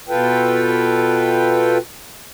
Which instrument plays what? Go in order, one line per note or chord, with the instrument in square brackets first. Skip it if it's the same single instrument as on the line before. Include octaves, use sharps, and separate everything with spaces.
[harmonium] B2 F4 A4 B4 G5